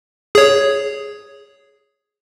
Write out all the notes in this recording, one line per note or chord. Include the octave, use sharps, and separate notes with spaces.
G#4 C#5